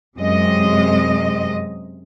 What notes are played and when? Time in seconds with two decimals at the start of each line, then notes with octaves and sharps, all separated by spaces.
0.17 F#2 C3 G#3 D#5